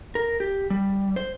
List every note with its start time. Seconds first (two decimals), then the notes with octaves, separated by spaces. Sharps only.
0.15 A#4
0.40 G4
0.70 G3
1.16 C5